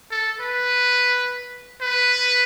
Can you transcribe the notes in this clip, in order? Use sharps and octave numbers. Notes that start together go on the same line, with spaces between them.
A4
B4
B4